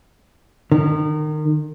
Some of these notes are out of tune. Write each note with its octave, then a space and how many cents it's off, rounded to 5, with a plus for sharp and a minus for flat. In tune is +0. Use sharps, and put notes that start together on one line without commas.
D#3 -30